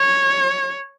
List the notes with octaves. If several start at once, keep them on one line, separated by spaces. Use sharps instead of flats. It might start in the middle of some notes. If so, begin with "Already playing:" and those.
Already playing: C#5